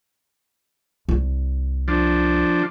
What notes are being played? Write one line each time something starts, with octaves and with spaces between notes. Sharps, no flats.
C2
F3 D4